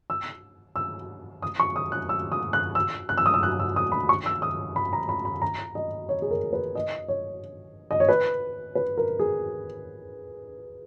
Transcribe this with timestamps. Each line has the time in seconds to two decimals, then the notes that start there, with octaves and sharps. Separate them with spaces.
0.10 E6
0.76 E6
1.42 D#6
1.60 C#6
1.76 D#6
1.92 F#6
2.09 E6
2.32 D#6
2.53 F#6
2.75 E6
3.09 F#6
3.18 E6
3.26 D#6
3.34 E6
3.43 F#6
3.59 E6
3.76 D#6
3.92 B5
4.09 C#6
4.26 E6
4.42 D#6
4.76 B5
4.93 A#5
5.09 B5
5.25 B5
5.42 A#5
5.75 D#5
6.09 C#5
6.22 G#4
6.31 A#4
6.53 B4
6.75 D#5
7.08 C#5
7.91 D#5
8.00 C#5
8.09 B4
8.75 B4
8.98 A#4
9.19 G#4